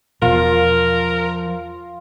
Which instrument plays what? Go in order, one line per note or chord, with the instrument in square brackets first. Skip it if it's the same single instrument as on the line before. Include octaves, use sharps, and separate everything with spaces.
[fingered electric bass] E1 B2 [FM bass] F3 [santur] F4 [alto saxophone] A#4